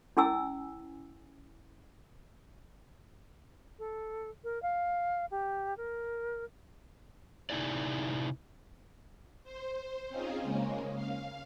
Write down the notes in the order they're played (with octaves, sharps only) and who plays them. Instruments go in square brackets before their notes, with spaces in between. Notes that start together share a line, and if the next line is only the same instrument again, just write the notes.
[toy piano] C#4 E4 G#5 E6
[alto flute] A4
A#4
F5
G4
A#4
[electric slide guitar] C3 D#4 E4 G#4 D5
[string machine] C5
C4 C#4 D#4 F4 G#4
C#3 G#3 A#3 C#4
F5